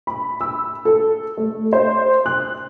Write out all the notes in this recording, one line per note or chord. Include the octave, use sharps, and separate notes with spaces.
B5
E6
A4
A3
C5
F#6